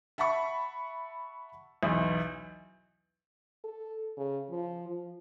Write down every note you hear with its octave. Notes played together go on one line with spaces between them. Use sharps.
E5 F#5 A5 B5 C#6
B1 E2
A4
C#3
F3
F3